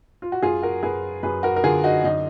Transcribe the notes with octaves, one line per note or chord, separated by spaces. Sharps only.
F4
F#4
F#2 F4 G#4
F#4 A#4
F#2 G#4 B4
F#2 G#4 B4
F#4 A#4
A#4
D3 F4 G#4
D#4 F#4
F#2 D#4